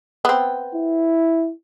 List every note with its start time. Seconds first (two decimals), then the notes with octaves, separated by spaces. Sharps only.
0.25 B3 C4
0.74 E4